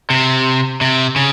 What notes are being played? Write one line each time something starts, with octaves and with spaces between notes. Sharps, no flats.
C3
C3
C#3